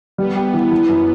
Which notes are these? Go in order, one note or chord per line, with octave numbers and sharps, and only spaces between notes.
G3 B3
G4
E3
E3
F#2